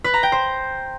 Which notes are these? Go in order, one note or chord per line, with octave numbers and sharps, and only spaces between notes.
B4
A#5
G5
C5